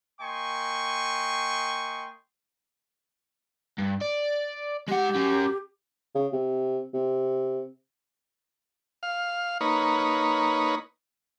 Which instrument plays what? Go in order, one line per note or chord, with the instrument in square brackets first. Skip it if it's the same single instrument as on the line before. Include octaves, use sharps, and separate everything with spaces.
[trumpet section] A#3 D#5 G5 G#5 C6 C#6
[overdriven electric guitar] G2
D5
[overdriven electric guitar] G#3 F#5 [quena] G4
[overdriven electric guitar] C#4 F#4
[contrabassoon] C#3
C3
C3
[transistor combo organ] F5
A#3 D#4 B4 C#5